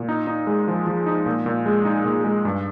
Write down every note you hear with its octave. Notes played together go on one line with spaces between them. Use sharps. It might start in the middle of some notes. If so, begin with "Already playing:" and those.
Already playing: A#2
D#4
D#4
G#3
F3
F3
D#4
A#2
A#2
G#3
D#4
A#2
G#3
G2